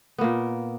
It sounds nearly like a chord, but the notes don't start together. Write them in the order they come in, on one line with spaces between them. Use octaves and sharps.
B3 A#3 A#2